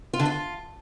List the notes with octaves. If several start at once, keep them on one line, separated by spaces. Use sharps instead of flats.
F4
D3
F4